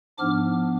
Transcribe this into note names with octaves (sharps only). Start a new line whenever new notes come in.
G#2 F3 B3 D4 D6 F6